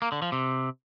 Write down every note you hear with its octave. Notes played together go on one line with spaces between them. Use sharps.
A#3
D3
F3
C3